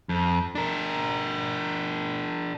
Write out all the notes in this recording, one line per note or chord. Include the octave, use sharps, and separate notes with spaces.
F2
D4 A#4